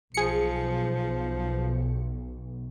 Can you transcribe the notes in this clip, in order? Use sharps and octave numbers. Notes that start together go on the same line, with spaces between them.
B1 F3 G#4 C#7